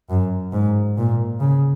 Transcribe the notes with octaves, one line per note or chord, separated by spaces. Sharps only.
F#2
G#2
A#2
C#3